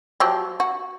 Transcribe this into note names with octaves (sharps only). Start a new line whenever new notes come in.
F3 F#3 G4
F#4